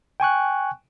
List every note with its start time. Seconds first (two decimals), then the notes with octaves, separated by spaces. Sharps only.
0.20 G5 G#5 C#6 F#6